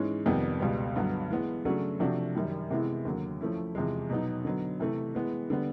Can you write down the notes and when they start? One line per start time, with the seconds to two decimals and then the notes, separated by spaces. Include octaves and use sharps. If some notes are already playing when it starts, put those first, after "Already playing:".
Already playing: G#2 E3 G#3 C#4
0.26 F2 C3 D#3 G3 B3
0.60 C#2 B2 G3 B3
0.95 G2 D3 F#3 B3
1.30 E3 G#3 B3
1.65 C#3 F#3 A3 D4 F#4
2.00 C3 F3 A3 D4 F#4
2.35 F#2 D#3 G3
2.70 C3 E3 G#3 B3 E4
3.05 D#2 D3 F#3
3.41 F3 A3 C#4 E4
3.75 E2 C3 F3 G#3
4.10 B2 F#3 B3 D#4
4.45 D3 F#3 B3
4.80 C3 E3 A3
5.15 E3 G#3 B3
5.50 D3 G3 B3